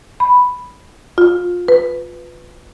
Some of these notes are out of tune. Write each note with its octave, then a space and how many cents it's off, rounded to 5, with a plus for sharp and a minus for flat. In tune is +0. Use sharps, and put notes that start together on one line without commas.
B5 +0
F4 +20
B4 +10